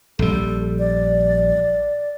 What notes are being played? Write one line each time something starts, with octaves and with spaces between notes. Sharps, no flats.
A#1 G3 A4
D5